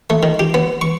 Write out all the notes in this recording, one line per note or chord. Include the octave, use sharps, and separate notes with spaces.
A3
D#3
G4
B3
C#6